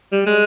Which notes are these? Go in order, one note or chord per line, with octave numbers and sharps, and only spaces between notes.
G3
G#3